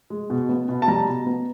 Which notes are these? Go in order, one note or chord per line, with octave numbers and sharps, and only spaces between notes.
G#3
B2
B3
B2
A5
G3 A#5
B2
B3